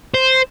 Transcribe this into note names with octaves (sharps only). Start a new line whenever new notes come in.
C5